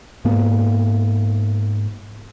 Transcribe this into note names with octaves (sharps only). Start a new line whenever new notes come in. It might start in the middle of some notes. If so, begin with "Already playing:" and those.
G#2 A#3 B3